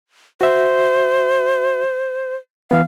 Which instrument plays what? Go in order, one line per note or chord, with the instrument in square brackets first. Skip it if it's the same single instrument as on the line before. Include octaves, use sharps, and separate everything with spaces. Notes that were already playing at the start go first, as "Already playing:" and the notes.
[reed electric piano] F#4 E5 [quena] C5
[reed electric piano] E3 B3 [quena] F5